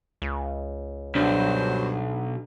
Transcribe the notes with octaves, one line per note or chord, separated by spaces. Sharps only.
C#2
B1 G2 F#3 D4 C5